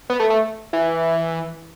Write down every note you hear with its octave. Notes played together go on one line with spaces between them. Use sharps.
B3
A3
A3
E3